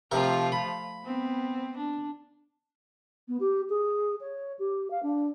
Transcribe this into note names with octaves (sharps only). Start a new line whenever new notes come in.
C3 F3 A3 F4 A#4 A#5
B5
B3 C4
D4
B3
G4
G#4
C#5
G4
F5
D4